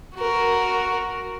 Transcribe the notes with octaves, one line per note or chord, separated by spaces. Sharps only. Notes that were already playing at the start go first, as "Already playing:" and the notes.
F#4 A#4